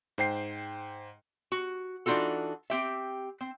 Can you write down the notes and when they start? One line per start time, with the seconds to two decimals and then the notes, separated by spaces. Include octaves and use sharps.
0.18 G#2 C5 G5 C7
1.52 F#4
2.06 E3 D4 D#4 F4 F#4 A4
2.70 C4 G4 E5
3.41 C4